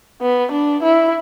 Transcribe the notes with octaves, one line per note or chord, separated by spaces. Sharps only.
B3
D4
E4